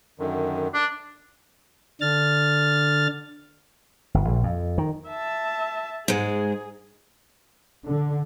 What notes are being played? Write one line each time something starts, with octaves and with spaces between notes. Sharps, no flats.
F#2 D3 D#3
D4
D3 D4 F6 A6
G1
A#1
F2
D#3
E5 A5
G#2 G#3 G#4
D3